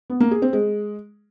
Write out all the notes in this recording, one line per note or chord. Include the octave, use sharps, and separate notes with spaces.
B3
A#3
G#4
C4
G#3